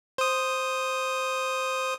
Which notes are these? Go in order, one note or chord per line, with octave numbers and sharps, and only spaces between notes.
C5 D#6